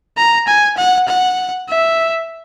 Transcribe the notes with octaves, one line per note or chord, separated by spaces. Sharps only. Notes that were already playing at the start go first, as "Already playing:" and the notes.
A#5
G#5
F#5
F#5
E5